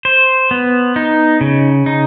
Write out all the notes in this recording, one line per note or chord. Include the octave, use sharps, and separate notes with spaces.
C5
B3
D#4
C#3
D#4